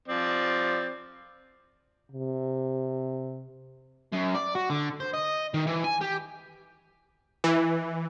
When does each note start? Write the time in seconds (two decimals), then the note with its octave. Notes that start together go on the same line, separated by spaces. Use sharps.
0.08 F3 C4 D5
2.12 C3
4.13 F#2
4.35 D5
4.55 F#4
4.70 D3
5.00 C5
5.14 D#5
5.54 D#3
5.67 E3
5.84 G#5
6.01 G4
7.44 E3